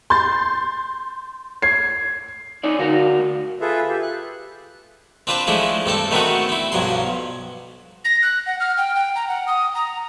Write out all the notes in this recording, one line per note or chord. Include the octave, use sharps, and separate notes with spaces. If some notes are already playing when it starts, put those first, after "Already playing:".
C6 G6 A6
G#6 C7
D#4 C#5 D5
D2 F#4 A#4 F5
F4 G#4 A4 B4 E5
G4 E5
F#6
C4 D4 F4 B4 C5 D5
F3 G#3 A3 D4 E4
G2 C4 A4 A5
D#3 A3 B3 C4 D4 F#4
C4 E4
B1 G2 F3 F#3 C6
A#6
F#6
F#5
F6
G5
G5
A#5
F#5
D#6
A#5